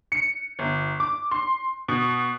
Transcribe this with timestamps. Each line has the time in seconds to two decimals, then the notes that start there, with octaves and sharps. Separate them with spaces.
0.12 C#7
0.59 G1
1.00 D6
1.31 C6
1.88 B2